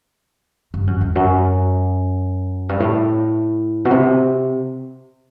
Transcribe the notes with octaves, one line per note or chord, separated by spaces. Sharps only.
G2
F#2
E2
F#2
G2
A2
B2
C3